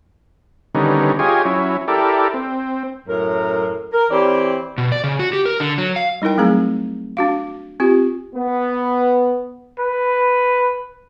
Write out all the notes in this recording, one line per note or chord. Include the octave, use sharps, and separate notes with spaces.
D3 D#3 G3 B3 C#4 D#4
F4 G4 G#4 C#5 D#5 G#5
F#3 C#4 E4
E4 G4 A4 A#4 D5
C4
F#2 A2 A#4
A#4
E3 C4 G4 C#5 D5
B2
D5
C#3
F#4
G4
A#4
D3
F#3
F5
G3 D#4 E4 A#4 G5
F#3 A3 C4 G#4 A#5
D4 F#4 F5
C4 F4 G4
B3
B4